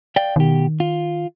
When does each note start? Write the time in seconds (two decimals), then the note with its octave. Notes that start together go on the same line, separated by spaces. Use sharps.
0.16 D5 F5 G5
0.36 B2 D#3 G4
0.80 F4